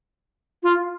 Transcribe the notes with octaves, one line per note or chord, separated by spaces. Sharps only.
F4